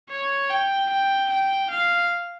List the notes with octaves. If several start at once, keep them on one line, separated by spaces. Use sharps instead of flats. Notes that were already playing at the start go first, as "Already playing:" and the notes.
C#5
G5
G5
G5
F5